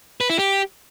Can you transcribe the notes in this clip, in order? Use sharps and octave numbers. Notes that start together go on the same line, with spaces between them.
B4
E4
G4